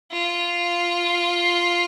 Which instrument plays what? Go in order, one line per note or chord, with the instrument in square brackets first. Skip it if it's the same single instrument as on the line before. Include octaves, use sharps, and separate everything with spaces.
[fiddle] F4